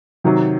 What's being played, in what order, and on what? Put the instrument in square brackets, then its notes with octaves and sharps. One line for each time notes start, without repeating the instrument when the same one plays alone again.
[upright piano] C3 D#3 F#3